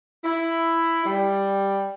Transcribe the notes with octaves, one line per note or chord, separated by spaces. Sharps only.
E4
G3